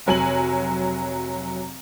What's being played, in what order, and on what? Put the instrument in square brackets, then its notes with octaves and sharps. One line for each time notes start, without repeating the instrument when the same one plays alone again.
[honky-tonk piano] F1 F#3 G#5 F#7